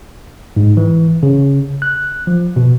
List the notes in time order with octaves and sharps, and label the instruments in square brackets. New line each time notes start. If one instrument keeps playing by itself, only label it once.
[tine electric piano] G#2
E3
C#3
F#6
F3
B2